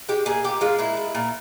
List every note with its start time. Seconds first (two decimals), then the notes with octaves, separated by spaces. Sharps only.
0.09 G#3 G4
0.26 A#2 G#4
0.44 A#2 G4
0.61 G#3 F4
0.78 A#2 E4
0.97 A#2
1.15 A#2